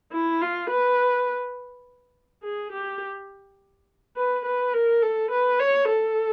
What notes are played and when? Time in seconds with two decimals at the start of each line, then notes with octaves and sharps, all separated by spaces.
0.12 E4
0.42 F4
0.70 B4
2.43 G#4
2.72 G4
4.17 B4
4.45 B4
4.73 A#4
5.02 A4
5.31 B4
5.60 C#5
5.88 A4